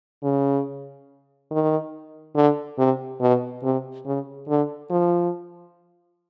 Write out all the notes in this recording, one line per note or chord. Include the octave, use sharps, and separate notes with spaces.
C#3
D#3
D3
C3
B2
C3
C#3
D3
F3